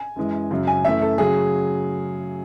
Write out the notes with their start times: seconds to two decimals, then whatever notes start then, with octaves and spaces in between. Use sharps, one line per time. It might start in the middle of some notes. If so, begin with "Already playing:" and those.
Already playing: G#5
0.16 F#2 E3 G#3
0.51 F#2 C#3 F#3
0.67 G#5
0.85 F#2 E3 A3 E5
1.02 A4
1.18 C#3 F#3 G#4